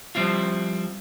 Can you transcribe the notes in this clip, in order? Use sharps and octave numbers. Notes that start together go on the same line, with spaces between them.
F3 G3 C4 E4 F4